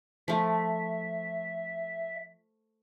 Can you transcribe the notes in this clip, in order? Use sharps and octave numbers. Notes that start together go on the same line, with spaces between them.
F3 A3 E5